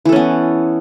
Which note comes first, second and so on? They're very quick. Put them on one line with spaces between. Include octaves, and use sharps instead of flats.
E3 A4 C#4 B3